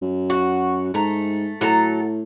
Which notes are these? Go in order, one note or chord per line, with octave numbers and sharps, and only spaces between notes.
F#2
F#4
G#2 A3 A#5
A2 F#3 A4 A#5